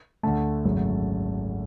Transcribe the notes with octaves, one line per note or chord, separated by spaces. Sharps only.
D2 D3 A3 A5
G#1 F#2 C#3 F#3 A3